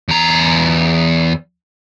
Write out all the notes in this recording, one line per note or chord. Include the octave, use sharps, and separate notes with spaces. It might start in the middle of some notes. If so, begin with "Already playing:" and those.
E2 A#5